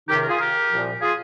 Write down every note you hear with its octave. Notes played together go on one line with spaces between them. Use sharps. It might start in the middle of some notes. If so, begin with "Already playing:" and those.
C#2 C3 D#3 D#4 G4
A#4
F4 G#4
G4 A#4
C2 A#2 F3
F4 G#4